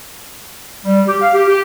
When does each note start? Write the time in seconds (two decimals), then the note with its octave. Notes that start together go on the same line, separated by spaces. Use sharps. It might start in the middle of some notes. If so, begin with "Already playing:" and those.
0.85 G3
1.07 G4
1.21 F5
1.33 G4
1.49 G4